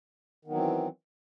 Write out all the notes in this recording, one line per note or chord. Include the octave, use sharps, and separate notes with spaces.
D#3 E3 F#3 B3 C4